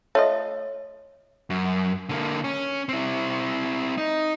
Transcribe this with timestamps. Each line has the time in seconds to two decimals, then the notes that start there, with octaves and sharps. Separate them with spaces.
0.15 A3 F4 C#5 D#5
1.50 F#2
2.09 D3 A#3
2.44 C#4
2.89 C4 E4
3.98 D#4